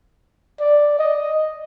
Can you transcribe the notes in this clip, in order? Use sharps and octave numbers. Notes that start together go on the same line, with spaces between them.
D5
D#5